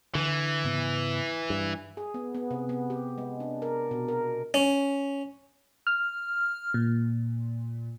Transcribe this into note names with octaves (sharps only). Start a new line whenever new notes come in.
D3 E3
G#2 C#3 B3
G2
G#4
B3
B3
C3
B3
G4
G#3
D4
A#4
B2
A#4
C#4
F6
A#2